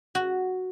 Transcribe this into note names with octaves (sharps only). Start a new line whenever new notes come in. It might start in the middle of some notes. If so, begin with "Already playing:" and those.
F#4